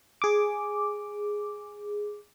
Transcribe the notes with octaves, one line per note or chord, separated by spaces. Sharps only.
G#4 D6